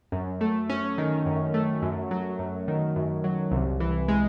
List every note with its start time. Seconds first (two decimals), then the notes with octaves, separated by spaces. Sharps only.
0.12 F#2
0.41 A3
0.70 C#4
0.98 D#3
1.26 F#2
1.54 A3
1.82 F#2
2.11 F#3
2.39 F#2
2.68 D#3
2.96 F#2
3.24 F#3
3.51 C2
3.80 E3
4.08 G#3